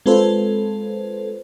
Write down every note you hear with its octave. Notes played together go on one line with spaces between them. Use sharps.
G#3 C4 F4 A4 B4 C5